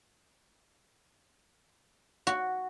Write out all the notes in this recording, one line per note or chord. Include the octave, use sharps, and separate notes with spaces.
F#4